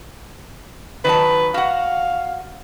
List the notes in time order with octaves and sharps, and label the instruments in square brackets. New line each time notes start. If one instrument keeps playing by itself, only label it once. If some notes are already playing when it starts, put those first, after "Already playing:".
[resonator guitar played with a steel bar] D#3 F#3 A5 [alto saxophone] B4
[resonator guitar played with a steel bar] F#4 F#5 [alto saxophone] F5